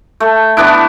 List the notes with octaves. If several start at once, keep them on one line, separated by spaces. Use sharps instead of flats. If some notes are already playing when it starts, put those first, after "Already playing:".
A3
E3 B3 D4 E4